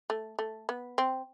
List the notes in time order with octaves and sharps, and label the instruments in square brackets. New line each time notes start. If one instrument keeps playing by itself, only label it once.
[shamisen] A3
A3
B3
C4